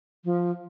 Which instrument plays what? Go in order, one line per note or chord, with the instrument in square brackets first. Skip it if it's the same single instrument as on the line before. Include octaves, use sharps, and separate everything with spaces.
[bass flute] F3